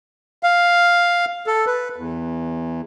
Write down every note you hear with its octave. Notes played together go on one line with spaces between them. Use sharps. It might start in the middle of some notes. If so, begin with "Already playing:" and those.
F5
A4
B4
E2